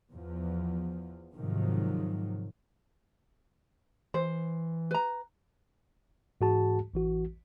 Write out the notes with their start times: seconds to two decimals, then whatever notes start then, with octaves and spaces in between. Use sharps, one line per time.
0.11 E2 F3
1.34 G#2 C3 D#3 F3 F#3
4.14 E3 C5
4.91 B4 A#5
6.41 G#2 E3 F#4 G#4 A5
6.94 A1 E3 F#4